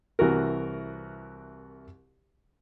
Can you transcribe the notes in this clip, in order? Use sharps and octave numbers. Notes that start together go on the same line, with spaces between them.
C2 E3 F#4 A#4